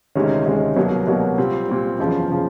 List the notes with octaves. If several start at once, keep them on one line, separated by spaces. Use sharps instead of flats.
D2 C3 D#3 G#3 C#4
D2 C3 D#3 G#3 C#4
C2 B2 F#3 A#3
C2 B2 F#3 A#3
A#2 G3 C4
A#2 G3 C4
F#1 E2 C#3 F3
C#3 F3